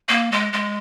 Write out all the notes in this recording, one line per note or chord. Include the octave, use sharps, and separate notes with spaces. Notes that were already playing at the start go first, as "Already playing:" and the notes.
A#3
G#3
G#3